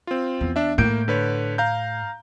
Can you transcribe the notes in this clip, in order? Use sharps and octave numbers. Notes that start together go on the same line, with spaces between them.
C4 F4
E2
D4 E5
A2 A#3 G6 D7
D3 B4 C#5
F5 A#5 G6